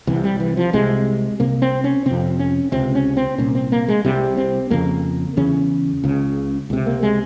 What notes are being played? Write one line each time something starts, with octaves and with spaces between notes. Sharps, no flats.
C2 C3 E3
G3
E3
F3
C2 C3 G#3
C2 C3 A#3
C4
C#4
F2 C3 C4
C#4
C#2 C3 C4
C#4
C4
C2 A#2 C#4
C4
A#3
G#3
C2 C3 G3
C4
F2 C#3 A#3
E2 C#3 C#4
C#2 C#3
C#2 C3
A#3
G#3